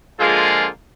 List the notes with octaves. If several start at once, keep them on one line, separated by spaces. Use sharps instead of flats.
D3 F3 G#3 A#3 F4 G#4